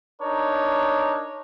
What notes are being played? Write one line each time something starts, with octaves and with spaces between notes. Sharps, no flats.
D4 D#4 A#4 C#5